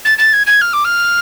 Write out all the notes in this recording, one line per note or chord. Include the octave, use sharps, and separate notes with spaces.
A6
A6
G#6
G#6
F6
D6
F6